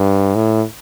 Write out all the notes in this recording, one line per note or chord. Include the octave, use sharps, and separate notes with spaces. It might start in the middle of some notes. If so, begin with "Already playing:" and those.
Already playing: G2
A2